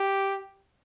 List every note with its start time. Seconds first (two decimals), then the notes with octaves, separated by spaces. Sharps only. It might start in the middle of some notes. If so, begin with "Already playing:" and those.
Already playing: G4